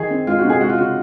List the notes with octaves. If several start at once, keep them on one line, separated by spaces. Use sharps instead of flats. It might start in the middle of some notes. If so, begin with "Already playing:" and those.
Already playing: D#3 G#4
C4
G#3 F4
F#4
C3 G#4
G#3 F#4
F4
C#3 F#4